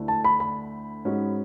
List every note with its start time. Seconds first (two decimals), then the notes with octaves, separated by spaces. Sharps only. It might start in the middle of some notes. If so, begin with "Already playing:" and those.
Already playing: D2 D3 A3 E4
0.08 A5
0.24 B5
0.40 B5
1.05 G#2 G#3 C#4 F#4